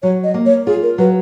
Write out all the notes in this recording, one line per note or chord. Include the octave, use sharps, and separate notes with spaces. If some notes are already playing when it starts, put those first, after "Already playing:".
F#3 C#5
D#5
A#3
C#5
F4 G#4
A#4
F#3 B4